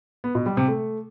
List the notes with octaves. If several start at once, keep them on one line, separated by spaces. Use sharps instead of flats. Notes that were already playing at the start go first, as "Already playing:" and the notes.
B3
B2
G3
C3
A3